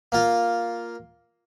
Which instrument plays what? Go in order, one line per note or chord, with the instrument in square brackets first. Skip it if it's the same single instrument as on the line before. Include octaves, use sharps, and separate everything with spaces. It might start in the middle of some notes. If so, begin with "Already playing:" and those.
[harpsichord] A#3 F4